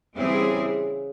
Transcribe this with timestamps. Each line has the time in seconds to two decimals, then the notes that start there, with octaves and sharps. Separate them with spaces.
0.16 C#3 E3 G3 C4 E4 G#4
0.24 D3
0.32 C#3